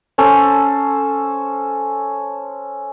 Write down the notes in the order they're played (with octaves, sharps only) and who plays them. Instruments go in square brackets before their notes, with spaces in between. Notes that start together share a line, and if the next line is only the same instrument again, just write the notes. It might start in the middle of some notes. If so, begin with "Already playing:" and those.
[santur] C#4 A4 C5